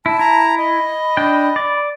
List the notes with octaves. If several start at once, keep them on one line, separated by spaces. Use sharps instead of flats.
E4 A5
E4 A#5
D#5 B5
D4 G5
D5